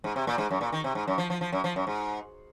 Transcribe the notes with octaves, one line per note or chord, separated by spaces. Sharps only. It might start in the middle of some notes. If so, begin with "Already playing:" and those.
G#2
C3
A#2
G#2
F#2
A#2
D#3
C3
G#2
F#2
F3
F3
F3
F#2
F3
F#2
G#2